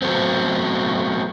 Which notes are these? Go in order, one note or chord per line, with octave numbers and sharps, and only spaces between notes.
F#3 A3 B3 C4